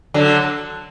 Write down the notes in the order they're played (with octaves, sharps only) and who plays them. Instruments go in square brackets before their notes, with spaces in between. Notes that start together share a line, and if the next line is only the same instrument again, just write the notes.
[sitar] D3 F#3